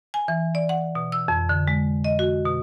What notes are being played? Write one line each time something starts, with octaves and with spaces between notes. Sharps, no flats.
G#5
E3
D5
F#5
B2
E6
F2
D3
G#3
D#5
F#4
B2